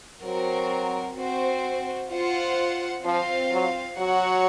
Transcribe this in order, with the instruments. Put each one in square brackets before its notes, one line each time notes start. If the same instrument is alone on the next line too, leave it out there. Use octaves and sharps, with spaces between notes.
[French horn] F#3 [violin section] C4 F#4 A#4
[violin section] C4 F#4 C5
F4 C5 F#5
[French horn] F3 [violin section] C4 F4 C5 F5
[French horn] F#3
[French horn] F#3 [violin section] F#4 C#5 F#5